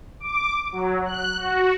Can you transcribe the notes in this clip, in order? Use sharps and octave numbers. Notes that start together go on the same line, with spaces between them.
D6
F#3
F#6
F#4